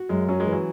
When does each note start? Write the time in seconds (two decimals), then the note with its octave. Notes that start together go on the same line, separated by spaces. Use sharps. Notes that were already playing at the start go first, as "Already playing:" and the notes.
Already playing: F#4
0.09 F#2 G#3
0.28 F#3 C#4
0.40 G#3
0.47 E3
0.53 F#3